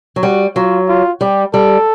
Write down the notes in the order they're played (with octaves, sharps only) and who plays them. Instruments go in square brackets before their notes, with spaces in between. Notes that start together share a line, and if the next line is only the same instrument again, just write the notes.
[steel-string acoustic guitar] F#3
[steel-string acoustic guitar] G3 [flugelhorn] F#4
[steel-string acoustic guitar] F#3 [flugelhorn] F4
[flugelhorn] F4
[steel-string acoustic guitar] G3 [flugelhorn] G4
[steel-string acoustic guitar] G3 [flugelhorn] A4